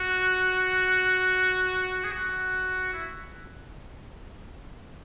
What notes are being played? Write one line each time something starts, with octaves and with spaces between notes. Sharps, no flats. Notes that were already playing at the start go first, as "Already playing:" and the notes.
Already playing: F#4
G#4
F#4
E4